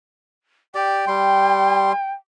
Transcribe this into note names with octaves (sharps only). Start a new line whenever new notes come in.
G4 D5 G5
G3 C6